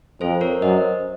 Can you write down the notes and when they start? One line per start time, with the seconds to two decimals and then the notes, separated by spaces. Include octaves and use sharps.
0.21 F2 A4 C5
0.41 A#4 C#5
0.61 F#2 C5 D#5